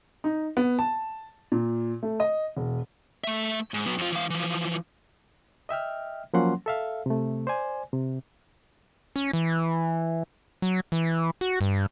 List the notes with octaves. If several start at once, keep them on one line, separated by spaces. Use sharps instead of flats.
D#4
B3
A5
A#2
A3
D#5
E1
A3 E5
G#2
F#3 B3
F2 F4
E3 F5
E3 F3
D#5 E5 G5 F6
F3 F#3 A#3 C#4 F#5 C6
A4 E5 F5
C3 A3
C5 D5 G#5
C3
C#4
E3
F#3
E3
F#4
G2